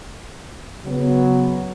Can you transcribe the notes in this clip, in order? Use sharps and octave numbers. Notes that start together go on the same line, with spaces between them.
C#3 F#3 B3